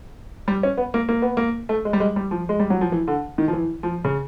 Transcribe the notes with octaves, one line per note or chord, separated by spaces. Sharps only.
G3
C#4
B3
A#3
A#3
B3
A#3
A3
G#3
G3
G#3
G3
F3
G#3
G3
F#3
F3
E3
D3
D#3
F3
E3
F3
C#3